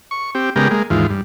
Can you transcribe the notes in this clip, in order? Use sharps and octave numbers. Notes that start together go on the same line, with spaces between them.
C#6
C4 G4
C#3 G#3 B3 G4 A#4
G#3 A#3
D#2 G#2 E3 F4
G2